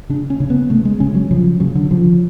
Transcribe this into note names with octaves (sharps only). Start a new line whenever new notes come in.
C#3 D4
C#4
C#3
B3
C#3 A3
G#3
C#3 C#4
F#3
C#3 F3
C#3 F#3
D3
C#3 F3